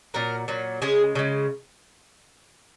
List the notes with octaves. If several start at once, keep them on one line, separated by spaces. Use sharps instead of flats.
A#2 F#3 A#4
A#2 F#3
C#3 G#3 G#4
C#3 G#3